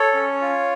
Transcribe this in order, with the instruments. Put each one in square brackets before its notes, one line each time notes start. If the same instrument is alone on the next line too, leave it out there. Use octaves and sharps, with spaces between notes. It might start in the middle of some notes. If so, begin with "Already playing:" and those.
Already playing: [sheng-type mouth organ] A4 C#5
C#4
F4